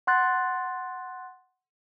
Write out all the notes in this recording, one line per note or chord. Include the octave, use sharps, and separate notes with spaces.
F#5 C6 F#6 A6